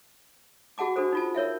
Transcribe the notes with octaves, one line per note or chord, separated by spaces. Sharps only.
F#4 G#4 F#5 A5 D6
D4 F#4 G#4 A4 C5
D#4 F4 A5
A#4 C#5 E5 F5